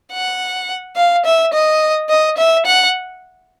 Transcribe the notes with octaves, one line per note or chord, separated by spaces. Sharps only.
F#5
F5
E5
D#5
D#5
E5
F#5